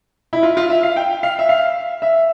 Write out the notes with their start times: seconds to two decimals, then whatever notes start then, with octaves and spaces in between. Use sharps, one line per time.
0.33 E4
0.43 F4
0.57 F4
0.70 E5
0.83 F5
0.96 G5
1.23 F5
1.39 E5
1.49 F5
2.02 E5